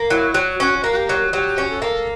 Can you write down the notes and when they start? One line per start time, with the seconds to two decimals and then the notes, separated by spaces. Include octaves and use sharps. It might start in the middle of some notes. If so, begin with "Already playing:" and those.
Already playing: A#3
0.10 F#3 E4
0.34 F#3 F#4
0.60 C#4 F#4
0.84 A#3
0.92 F#4
0.96 G4
1.09 F#3
1.33 F#3 G4
1.58 C#4
1.70 A4
1.82 A#3